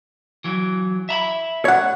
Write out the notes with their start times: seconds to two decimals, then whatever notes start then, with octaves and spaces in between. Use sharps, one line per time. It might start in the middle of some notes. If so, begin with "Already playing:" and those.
0.44 E3 F#3
1.09 E5 A#5 B5
1.65 C#5 F#5